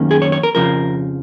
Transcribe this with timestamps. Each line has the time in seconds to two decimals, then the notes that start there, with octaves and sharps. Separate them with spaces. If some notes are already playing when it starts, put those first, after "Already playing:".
Already playing: F#2 D#3 A#3 C#4
0.11 G#4
0.22 C#5
0.32 C#5
0.43 A#4
0.55 F2 C#3 F3 A#4